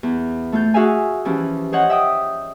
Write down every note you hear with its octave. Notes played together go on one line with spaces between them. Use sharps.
E2
A3 F4 G6
F#4 G#4 E5 F5 G#5
E3 F3 C#4 G4
C5 C#5 D#5 F#5
E5 G5 D#6